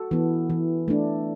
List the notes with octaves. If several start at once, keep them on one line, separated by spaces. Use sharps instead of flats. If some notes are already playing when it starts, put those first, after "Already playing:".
Already playing: F#4 A4
E3 B3
E3
A3 D4